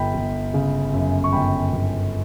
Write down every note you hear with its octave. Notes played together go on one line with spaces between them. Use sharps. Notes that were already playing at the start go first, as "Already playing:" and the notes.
Already playing: G1 G5 B5
G1
C#3
F#2
C#6
G1 G5 B5
G1